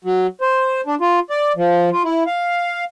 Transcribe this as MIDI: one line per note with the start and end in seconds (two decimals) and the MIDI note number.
0.04 0.27 54
0.41 0.81 72
0.86 0.95 62
1.01 1.20 65
1.30 1.52 74
1.56 1.90 53
1.92 2.03 65
2.04 2.23 64
2.27 2.84 77